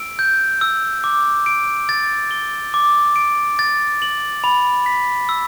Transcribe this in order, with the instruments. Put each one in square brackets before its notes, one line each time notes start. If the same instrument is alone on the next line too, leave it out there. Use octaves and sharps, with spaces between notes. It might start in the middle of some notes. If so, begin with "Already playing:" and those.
Already playing: [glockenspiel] E6 D7
G6
E6
D6
D7
A6
G7
D6
D7
A6
F#7
B5
B6
E6